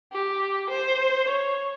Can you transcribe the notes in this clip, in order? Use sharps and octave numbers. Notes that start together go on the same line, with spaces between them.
G4
C5
C#5